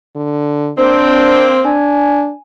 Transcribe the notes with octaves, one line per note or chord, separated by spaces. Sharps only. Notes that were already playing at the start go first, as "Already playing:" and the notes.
D3
A#3 C4 D4 C5
D4 G#5